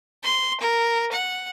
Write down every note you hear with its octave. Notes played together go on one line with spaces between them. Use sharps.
C6
A#4
F#5